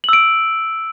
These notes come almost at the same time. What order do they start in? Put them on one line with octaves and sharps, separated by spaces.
F#7 E6 D7